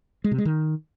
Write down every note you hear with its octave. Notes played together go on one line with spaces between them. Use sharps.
G#3
C3
G#3
D#3